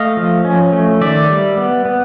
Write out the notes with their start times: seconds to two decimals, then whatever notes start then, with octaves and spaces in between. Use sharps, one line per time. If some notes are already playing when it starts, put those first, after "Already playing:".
Already playing: A3 D#5 F5
0.17 F3
0.45 C#4
0.73 A3
1.01 D#3 D5 E5
1.29 G3
1.57 B3
1.85 B3